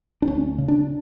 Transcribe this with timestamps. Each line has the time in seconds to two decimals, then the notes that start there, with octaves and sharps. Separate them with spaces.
0.22 D4
0.27 D2 C#4
0.58 C#3
0.68 D4